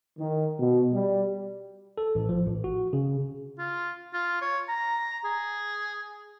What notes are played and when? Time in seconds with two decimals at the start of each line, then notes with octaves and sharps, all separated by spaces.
0.19 D#3
0.60 B2
0.93 G3
1.98 A4
2.15 A1
2.29 F3
2.45 A1
2.64 F#4
2.93 C#3
3.58 F4
4.13 F4
4.42 C#5
4.69 A#5
5.25 G#4